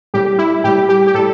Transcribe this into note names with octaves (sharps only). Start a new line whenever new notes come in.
A2 G3 G4
E4
A2 G3 G4
G4
G4
A2 G3 A4